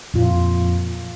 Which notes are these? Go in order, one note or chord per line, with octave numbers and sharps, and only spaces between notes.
F2 A#2 F4